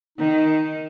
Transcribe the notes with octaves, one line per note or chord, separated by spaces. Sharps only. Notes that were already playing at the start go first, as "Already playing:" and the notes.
D#3 D#4